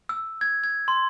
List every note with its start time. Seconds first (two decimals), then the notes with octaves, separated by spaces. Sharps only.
0.09 E6
0.41 G#6
0.64 G#6
0.88 C6